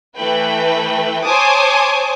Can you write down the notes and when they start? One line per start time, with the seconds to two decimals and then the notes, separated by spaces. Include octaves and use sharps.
0.17 E3 A3 B4 G5
1.24 C5 C#5 G#5 A5 D6 D#6